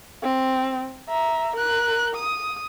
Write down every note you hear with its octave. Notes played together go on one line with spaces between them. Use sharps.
C4
E5 A#5
A#4 F#6
D#6